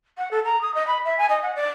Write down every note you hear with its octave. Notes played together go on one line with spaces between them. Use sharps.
F#5
A4
A#5
D#6
D#5
B5
E5
G#5
D#5
F#5
D5